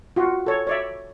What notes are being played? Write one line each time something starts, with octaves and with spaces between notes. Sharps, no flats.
F4 F#4
A4 C#5
C#5 D5 E5